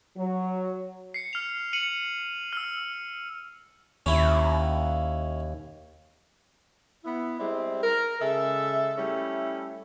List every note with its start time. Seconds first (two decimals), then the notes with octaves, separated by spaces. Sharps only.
0.17 F#3
1.14 C7 C#7
1.33 F6 F7
1.73 C#7 D#7 F#7
2.53 E6 F6
4.06 D#2 C#4 E4
7.04 B3 E4
7.39 G3 G#3 C4 E4 D5
7.83 A#4
8.21 C#3 G#3 A4 E5
8.97 G3 A3 C#4 E4 A4